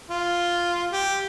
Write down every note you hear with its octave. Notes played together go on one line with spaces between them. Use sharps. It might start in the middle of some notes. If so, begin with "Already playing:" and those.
F4
G4